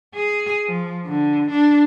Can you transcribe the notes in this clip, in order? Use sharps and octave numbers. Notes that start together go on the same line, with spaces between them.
G#4
F3
D3
D4